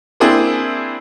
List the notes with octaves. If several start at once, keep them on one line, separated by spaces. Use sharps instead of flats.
A#3 C4 D4 E4 G#4